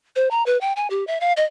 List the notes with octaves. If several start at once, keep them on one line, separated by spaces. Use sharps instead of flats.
C5
A#5
B4
G5
G#5
G4
E5
F5
D#5